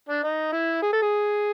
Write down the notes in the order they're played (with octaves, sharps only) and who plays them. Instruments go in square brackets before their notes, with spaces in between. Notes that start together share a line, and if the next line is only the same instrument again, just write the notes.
[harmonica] D4
D#4
E4
G#4
A4
G#4